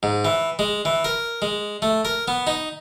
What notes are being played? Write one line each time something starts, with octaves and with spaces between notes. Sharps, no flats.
G#2
E3
G#3
E3
A#4
G#3
A3
A#4
B3
D#4